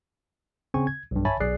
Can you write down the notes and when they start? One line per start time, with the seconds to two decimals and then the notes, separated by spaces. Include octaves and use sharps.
0.74 C#3 C4 G#5 C#6
0.87 G#6
1.11 B1 G2
1.25 C#5 E5 G#5 A5 B5 A6
1.40 B1 G#4 D5 F#6 C7